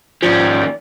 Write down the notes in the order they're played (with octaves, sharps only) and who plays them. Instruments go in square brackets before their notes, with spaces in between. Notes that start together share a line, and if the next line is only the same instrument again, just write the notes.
[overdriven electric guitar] D#2 C#4 [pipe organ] G#2 G5 [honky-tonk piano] F3 [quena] D5